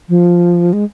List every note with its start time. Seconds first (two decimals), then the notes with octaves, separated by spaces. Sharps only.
0.09 F3
0.73 G#3